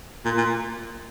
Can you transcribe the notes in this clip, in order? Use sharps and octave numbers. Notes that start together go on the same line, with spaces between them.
A#2
A#2